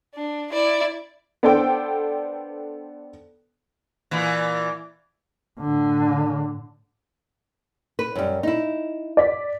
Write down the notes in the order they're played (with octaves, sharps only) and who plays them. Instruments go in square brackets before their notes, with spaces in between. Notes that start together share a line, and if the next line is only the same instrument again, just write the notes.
[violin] D4
E4 D5
[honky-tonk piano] B3 D4 A4 C5 G5
[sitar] A#2 E3
[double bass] A2 D3
[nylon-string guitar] B4
F#2 G3
D#4 E4
[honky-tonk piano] D5 B6